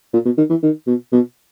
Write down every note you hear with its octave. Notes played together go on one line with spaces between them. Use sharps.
A#2
B2
D#3
E3
D#3
B2
B2